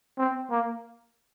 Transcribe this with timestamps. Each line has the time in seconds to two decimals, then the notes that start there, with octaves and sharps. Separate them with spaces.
0.18 C4
0.50 A#3